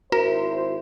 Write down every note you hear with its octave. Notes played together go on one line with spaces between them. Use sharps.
G#1 E4 F#4 A#4 C5